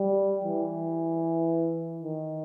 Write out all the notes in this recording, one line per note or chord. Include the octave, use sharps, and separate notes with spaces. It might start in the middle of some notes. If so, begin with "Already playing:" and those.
Already playing: G3
E3
D#3